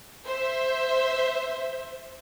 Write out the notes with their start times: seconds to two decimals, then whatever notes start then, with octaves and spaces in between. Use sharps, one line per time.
0.25 C5 E5